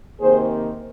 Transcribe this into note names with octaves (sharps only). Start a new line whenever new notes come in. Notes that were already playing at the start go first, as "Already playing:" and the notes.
C3 D#3 A#3 G#4 C5